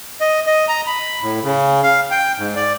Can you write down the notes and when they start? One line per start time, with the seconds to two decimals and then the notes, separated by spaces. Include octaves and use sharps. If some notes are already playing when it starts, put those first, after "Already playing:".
0.21 D#5
0.47 D#5
0.68 A#5
0.87 B5
1.22 A2
1.43 C#3
1.83 F5
2.11 G5
2.38 G#2
2.56 D5